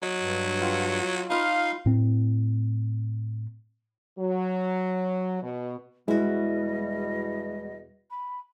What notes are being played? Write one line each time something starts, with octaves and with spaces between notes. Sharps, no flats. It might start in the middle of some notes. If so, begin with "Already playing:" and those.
F#3 D#5
G2
F4 F#5 G5
D#4 F4 B4 F5 C6
A2 C4
F#3
B2
E2 B2 G3 G#3 E4 F#4 D#5
B5